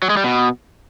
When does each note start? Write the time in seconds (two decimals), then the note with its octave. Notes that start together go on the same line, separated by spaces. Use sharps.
0.02 F#3
0.10 G#3
0.17 G3
0.24 B2